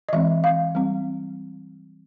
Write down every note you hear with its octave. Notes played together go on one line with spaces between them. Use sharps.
D#5
E3 G#3 C4 E5
F5
G3 C4